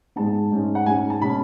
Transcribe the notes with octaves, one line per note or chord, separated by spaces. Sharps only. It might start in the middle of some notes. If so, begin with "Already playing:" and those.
G#2 G#3 B3 A5
G#2 G#3 C#4
F#5
G#2 G#3 C#4 G#5
A5
B2 G#3 C#4 B5